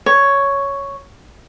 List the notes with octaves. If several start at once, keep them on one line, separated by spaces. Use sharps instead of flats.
C#5